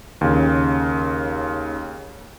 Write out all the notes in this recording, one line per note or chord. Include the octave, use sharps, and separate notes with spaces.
D#2 C#3